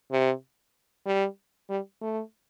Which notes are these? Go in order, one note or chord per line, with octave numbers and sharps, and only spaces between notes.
C3
G3
G3
A3